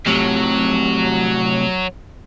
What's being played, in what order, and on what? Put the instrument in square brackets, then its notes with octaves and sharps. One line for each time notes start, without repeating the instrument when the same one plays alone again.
[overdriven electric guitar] A2 C3 [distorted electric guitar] F#3